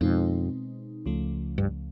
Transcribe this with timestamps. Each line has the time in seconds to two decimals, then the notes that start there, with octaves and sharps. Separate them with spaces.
0.01 F2 B2 G#3 C4 D#4
1.06 C#2 C#3 F3 A3
1.58 G2